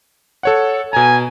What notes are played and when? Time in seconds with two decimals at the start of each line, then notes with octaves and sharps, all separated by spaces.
0.43 A4 C#5 F#5
0.93 B2 G#5 A#5